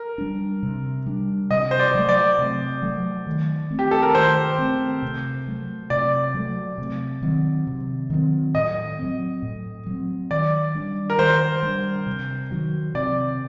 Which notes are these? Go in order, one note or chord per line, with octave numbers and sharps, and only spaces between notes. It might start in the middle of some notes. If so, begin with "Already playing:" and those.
Already playing: A#4
G3 D4
C3
G3 D4
C3 D#5
C5
D5
F#3 A3
D5
C3
F#3 A3
D#3
A3 C4
G4
A4
A#4
D#3 C5
A3 C4
C3
F#3 A3
C3 D5
F#3 A3
C3
D#3 F#3 C4
C3
D#3 F#3 C4
A2 D#5
F#3 C4
A2
F#3 C4
D#3 D5
G3 D4
A#4
D#3 C5
G3 D4
C3
D#3 F#3
C3 D5